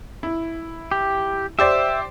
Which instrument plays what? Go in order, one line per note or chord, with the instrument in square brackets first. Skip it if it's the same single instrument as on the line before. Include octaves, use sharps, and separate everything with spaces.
[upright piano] E4
[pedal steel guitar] G4
[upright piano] G4 C5 D5 [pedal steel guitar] E5